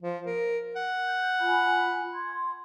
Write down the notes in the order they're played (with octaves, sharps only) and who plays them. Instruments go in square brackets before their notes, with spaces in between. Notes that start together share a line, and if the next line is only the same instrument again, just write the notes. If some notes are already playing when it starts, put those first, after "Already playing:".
[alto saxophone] F3
A#4
F#5
[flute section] G6
F4 G#5 B5
C6 G#6